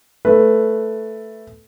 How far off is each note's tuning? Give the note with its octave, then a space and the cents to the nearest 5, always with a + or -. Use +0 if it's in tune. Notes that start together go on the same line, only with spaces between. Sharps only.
A3 +0 B4 +0